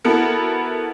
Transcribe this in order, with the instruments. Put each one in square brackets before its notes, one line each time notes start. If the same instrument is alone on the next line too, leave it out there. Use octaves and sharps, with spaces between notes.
[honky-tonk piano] B3 E4 F#4 A4 A#4